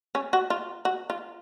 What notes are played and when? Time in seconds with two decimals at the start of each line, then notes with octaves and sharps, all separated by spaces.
0.15 C#4
0.33 F#4
0.50 F4
0.85 F#4
1.10 F4